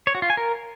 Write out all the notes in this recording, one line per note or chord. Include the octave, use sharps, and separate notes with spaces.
C#5
F#4
F4
G#5
A#4